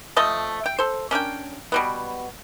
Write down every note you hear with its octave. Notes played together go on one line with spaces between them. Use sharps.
F3 A3 D#5 A5
G5
A4 C5
C#4 D4 A#4 G5
B2 G3 B3